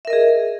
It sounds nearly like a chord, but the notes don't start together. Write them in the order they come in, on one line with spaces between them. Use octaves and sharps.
E5 A#4 D#5 G#4